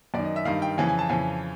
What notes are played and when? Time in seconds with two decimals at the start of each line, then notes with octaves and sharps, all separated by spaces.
0.14 F#2 D5
0.18 D#3
0.25 D#5
0.36 E5
0.45 G2 D#3 F5
0.62 G5
0.78 F2 C#3 E3 G#5
0.88 G#5
0.99 A5
1.09 F2 C#3 E3 G#5